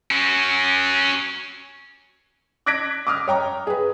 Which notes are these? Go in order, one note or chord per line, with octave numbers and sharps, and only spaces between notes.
C#4 F#4
D6 F#6 G#6 A#6 B6 D7
D6 D#6 F6
C#5 G5 A#5
G#4 B4